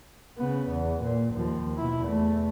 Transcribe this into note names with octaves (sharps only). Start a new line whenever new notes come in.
C#3 B3
E2
A#2
D#2 F3
B2 E4
E2 A3